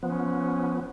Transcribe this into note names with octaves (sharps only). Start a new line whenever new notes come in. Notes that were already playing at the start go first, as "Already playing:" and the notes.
F3 B3 C#4